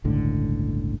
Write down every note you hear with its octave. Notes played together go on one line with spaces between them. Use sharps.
G1 C#2 A2 D3